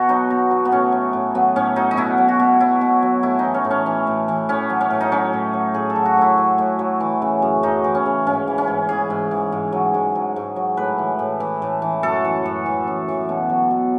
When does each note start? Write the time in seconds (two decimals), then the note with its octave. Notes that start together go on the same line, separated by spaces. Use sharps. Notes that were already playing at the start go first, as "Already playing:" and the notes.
Already playing: B2 F#4
0.09 F#3 D#4
0.30 B2
0.51 F#3
0.65 B3
0.71 A2 C#4
0.92 F#3
1.13 A2
1.35 F#3 B3
1.56 A2 C#4
1.76 F#3 D#4
1.91 D#4
1.97 B2 E4
2.18 F#3
2.28 F#4
2.40 B2
2.60 F#3 E4
2.81 B2
3.03 F#3
3.23 A2 E4
3.39 D#4
3.44 E3
3.54 C#4
3.65 A2
3.71 C#4
3.86 E3
4.07 A2
4.28 E3
4.49 A2 C#4
4.70 F#3
4.81 C#4
4.90 A2
5.01 D#4
5.12 F#3 C#4
5.33 A2
5.53 F#3
5.74 A2 G#4
5.90 A4
5.96 F#3
6.05 F#4
6.17 A2 E4
6.38 F#3
6.58 A2
6.79 F#3
7.00 E3
7.22 C#3
7.42 F#2
7.63 F#2 D#4
7.84 E3
7.95 C#4
8.06 C#3
8.26 G#2 C#4
8.47 E3
8.58 C#4
8.68 G#2
8.89 E3 G#4
9.10 G#2
9.31 E3
9.52 G#2
9.73 F#3
9.94 G#2
10.15 F#3
10.36 G#2
10.56 F#3
10.77 A2 B4
10.98 E3
11.19 A2
11.40 E3
11.62 A2
11.82 E3
12.03 F#2 A4
12.25 E3
12.45 F#2
12.66 E3
12.87 F#2
13.08 E3
13.29 B2
13.50 F#3
13.71 B2